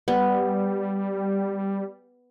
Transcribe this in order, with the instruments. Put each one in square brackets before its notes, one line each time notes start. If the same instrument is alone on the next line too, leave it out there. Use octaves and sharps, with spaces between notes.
[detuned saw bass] G3 [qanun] B3